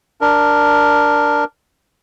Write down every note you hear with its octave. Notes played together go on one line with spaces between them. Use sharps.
D4 A#4